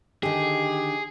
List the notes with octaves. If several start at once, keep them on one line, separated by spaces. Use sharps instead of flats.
D3 D#3 G4 G#4